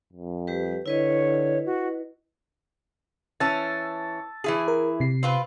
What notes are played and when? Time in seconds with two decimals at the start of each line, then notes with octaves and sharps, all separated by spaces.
0.13 F2
0.47 G3 G4 B4
0.86 D3 E4 B4 C#5 D#5
1.66 F#4
3.40 E3 C#4 A5 E6 A6
4.44 E3 E4 G#4
4.68 A#4
5.00 C3 C7
5.23 C4 F4 B4